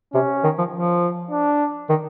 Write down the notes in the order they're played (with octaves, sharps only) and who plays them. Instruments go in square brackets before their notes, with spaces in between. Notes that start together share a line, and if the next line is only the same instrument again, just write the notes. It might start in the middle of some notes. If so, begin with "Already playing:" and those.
[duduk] C3 [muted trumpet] C#4
[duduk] D#3
F3
F3
[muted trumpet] D4
[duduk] D#3